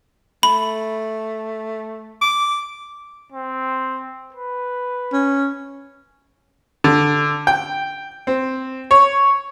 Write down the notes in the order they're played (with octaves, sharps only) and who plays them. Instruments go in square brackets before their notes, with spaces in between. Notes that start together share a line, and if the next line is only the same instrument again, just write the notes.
[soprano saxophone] A3 [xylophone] B5
[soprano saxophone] D6
[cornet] C4
B4
[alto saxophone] C#4
[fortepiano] D3
G5
C4
C#5